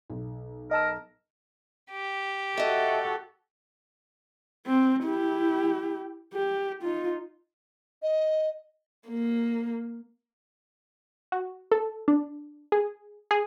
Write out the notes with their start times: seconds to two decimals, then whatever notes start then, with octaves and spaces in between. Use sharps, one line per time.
0.10 B1
0.71 A#4 D#5 A5 E6
1.91 G4
2.57 F#4 A4 D#5 E5
4.66 C4
5.03 E4 G4
6.34 G4
6.83 D#4 F4
8.02 D#5
9.08 A#3
11.32 F#4
11.71 A4
12.08 D4
12.72 G#4
13.31 G#4